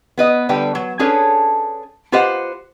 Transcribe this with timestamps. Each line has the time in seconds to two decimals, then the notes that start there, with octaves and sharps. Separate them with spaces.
0.18 B3 B4 D#5
0.49 D3 G3 B4 G5
0.75 F#3
0.99 C#4 D4 G#4 A4 B4 C#5
2.12 F4 G4 B4 C5 D#5 F#5